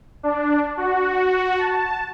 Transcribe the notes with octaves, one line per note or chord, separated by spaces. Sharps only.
D4
F#4
A5